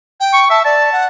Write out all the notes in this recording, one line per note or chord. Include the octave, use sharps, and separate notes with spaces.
G5
C#6
E5 A5
D5 A5
F#5